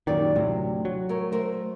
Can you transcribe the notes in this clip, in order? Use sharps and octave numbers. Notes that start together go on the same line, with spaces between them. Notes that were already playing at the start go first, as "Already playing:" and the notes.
F#2 A#2 D#3 G4 C#5 D5
D2 A2 C3 F#3
F#3
A3 A#4 C#5
A3 A#4 C5